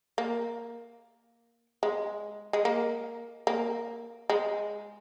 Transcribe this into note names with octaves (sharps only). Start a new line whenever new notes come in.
A#3
G#3
G#3
A#3
A#3
G#3